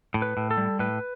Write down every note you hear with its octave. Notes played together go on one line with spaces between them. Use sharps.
A2
B4
A2
A4
G3
A2 B4